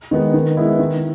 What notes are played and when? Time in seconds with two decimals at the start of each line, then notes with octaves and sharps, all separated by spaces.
0.11 D#3 G#3 B3 D#4
0.34 D#3
0.57 G#3 B3 E4
0.79 D#3